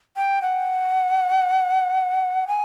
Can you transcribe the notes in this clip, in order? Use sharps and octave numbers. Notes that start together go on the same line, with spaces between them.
G5
F#5
G#5